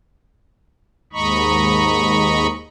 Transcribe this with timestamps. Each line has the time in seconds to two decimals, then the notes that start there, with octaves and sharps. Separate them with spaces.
1.13 D#2 G#2 D#5 A#5 B5 C#6